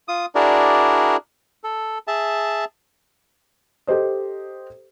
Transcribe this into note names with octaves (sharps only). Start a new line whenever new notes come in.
F4 D#6
D4 E4 F#4 G#4 A#4 D5
A4
G#4 E5 A5
G4 A4 C5 D#5